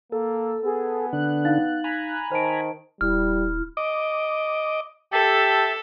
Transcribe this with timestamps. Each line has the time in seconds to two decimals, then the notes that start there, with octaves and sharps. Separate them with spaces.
0.12 A#3 A4
0.65 B3 G#4
1.13 D3 D4 F#6
1.45 D#4 F5 A6
1.84 G#5 A#5 B5
2.32 D#3 C5 A5 D7
3.01 D#1 G3 E4 F6
3.77 D#5 D6
5.13 G4 A4 E5 A5